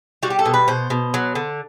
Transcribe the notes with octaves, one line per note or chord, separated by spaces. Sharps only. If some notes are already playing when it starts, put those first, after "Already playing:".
G3 F#4
G4
A4
B2
B4
B2 C5
B2
F#3
D3